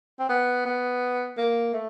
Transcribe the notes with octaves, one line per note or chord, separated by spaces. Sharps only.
C4
B3
B3
A#3
A3